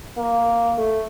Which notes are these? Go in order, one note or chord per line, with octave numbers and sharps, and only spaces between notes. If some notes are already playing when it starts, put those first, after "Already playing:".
A#3
A3